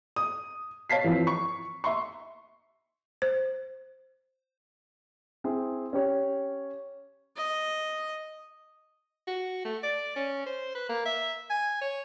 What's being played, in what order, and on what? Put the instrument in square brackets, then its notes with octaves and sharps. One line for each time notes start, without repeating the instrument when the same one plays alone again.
[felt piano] D#6
C#5 F5 A5 B6 C7
E3 F3 C4
C#6
E5 C6 C#6
[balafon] C5
[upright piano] C4 E4 G#4
C#4 G4 C#5
[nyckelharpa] D#5
[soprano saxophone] F#4
A3
D5
C#4
C5
B4
A#3
E5
G#5
C#5